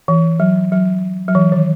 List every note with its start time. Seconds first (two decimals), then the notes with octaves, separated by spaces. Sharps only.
0.08 E3
0.40 F#3
0.72 F#3
1.28 F#3
1.35 E3
1.52 D#3